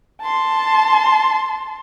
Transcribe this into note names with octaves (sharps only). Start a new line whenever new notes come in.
A5 C6